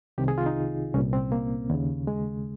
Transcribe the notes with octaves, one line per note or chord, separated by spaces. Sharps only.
C2 C3 D#3 G4
G#4
F4
D#4
C2 A#2 C#4
C4
A#3
D#2 C#3
G#3